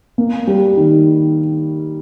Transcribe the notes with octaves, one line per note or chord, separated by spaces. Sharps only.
A#3
G3
D#3